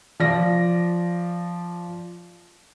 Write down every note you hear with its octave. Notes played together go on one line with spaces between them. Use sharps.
F3 D5 A#6